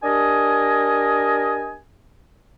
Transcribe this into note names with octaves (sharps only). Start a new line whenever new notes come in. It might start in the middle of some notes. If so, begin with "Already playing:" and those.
D4 G4 A#4 D#5 G#5